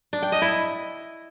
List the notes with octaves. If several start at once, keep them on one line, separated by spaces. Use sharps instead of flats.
D4
G5
D#5
E4